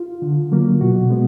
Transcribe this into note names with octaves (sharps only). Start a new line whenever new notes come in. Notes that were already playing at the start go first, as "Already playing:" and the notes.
Already playing: F4
D3
F#3 A#3
B2 F#4
G#3 B3